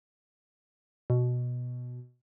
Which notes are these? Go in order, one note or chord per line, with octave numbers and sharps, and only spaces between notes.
B2